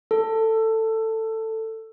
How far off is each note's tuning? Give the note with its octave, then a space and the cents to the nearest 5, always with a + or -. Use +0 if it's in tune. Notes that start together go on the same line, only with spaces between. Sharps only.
A4 +15